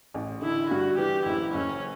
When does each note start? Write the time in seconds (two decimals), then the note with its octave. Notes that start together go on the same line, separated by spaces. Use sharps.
0.14 A1
0.42 D3 E4
0.70 G2 F#4
0.98 E3 G4
1.26 F#1 E4
1.55 F#1 C#4